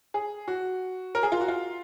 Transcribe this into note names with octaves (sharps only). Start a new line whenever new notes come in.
G#4
F#4
A#4
G#4
F4
F#4
F4